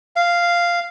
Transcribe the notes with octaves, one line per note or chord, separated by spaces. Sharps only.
F5